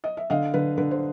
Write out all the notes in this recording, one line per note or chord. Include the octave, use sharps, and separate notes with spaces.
D#5
E5
D3 D#5 F5
D3 B4
D3 B4
C5